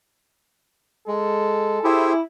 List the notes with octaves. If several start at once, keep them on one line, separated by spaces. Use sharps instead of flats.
G#3 A4
E4 G4 G#4 C5